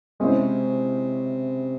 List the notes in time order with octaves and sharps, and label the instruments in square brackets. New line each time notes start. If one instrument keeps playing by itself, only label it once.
[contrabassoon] C3 [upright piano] G#3 C#4 E4 C5